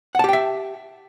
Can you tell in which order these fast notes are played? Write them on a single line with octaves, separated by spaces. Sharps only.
F#5 A5 G4 G5 E5